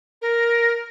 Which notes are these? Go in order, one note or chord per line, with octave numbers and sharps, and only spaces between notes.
A#4